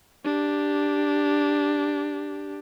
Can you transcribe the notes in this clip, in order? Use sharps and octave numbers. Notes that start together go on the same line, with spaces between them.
D4 G4